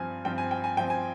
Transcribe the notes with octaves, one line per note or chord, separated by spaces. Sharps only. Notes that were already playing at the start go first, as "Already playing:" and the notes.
Already playing: G2 F3 C4 G#5
G2 F3 C4 G5
G#5
G5
G#5
G2 F3 C4 G5
G#5